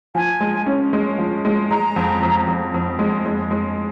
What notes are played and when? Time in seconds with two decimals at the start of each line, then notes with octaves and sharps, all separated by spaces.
0.15 F3 G#5
0.40 G#3
0.66 C#4
0.93 G#3
1.18 F3
1.45 G#3
1.71 G#3 A#5
1.96 F2
2.22 F2
2.47 F2
2.74 F2
2.99 G#3
3.26 G#3
3.51 G#3